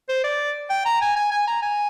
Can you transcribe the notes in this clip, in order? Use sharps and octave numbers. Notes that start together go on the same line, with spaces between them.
C5
D5
G5
A#5
G#5
G#5
G#5
A#5
G#5